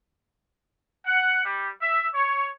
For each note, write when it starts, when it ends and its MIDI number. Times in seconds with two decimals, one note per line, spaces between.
1.05 1.40 78
1.44 1.69 55
1.82 2.06 76
2.14 2.49 73